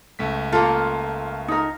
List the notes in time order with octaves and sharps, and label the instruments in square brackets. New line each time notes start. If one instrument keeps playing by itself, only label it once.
[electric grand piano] C#2 A3 B6
[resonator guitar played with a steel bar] A#3 A4 [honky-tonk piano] F4
[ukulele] D#4 A#4